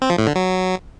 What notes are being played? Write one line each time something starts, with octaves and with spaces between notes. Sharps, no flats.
C4
F3
A2
D3
F#3